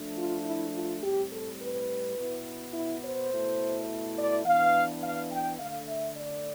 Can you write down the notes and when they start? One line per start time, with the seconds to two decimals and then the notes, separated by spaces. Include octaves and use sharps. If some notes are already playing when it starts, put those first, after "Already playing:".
Already playing: F3 A3 D4
0.17 F4
0.45 E4
0.75 F4
1.03 A2 G3 C4 G4
1.32 A4
1.61 B4
2.17 B2 B3 E4
2.74 E4
3.03 C5
3.31 B2 A3 E4
4.18 D5
4.45 E3 B3 D4 F5
5.02 F5
5.31 G5
5.60 D3 A3 D4 F5
5.88 E5
6.17 D5